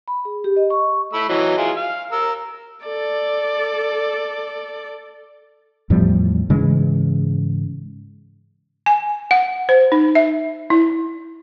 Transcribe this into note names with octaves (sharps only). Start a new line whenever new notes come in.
B5
G#4
G4
D#5
C#6
A3 B5 E6
E3 F#3 D#5
E4 F4 G#4
F5
A#4 E6
A4 D5
E2 A2 F3 G3
G#2 C#3 E3 G#3
G#5
F#5
C5
D#4
E5
E4